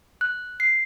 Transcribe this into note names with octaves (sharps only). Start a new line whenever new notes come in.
F#6
C7